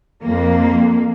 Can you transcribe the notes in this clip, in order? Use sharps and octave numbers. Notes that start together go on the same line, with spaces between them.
F2 A#3